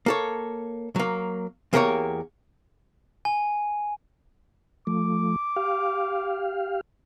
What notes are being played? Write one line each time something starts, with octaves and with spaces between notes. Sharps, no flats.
A#3 A4 C#5
F#3 A#3
E2 A#3 G4 A#4 B4 C#5
G#5
F3 A3 D6
G4 F5